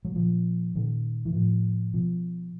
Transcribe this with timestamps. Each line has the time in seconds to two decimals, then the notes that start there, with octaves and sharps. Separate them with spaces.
0.05 F#3
0.15 A#2 F3
0.75 A#2 D#3
1.25 E3
1.34 A2 F3
1.94 B2 F3